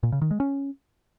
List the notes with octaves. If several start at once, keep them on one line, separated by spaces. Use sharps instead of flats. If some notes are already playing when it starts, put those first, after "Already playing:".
A#2
C#3
D#3
G#3
C#4